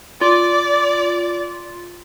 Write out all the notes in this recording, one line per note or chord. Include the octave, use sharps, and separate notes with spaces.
F4 D5